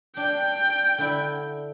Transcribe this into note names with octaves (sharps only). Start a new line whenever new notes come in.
D4 G5
D3 E4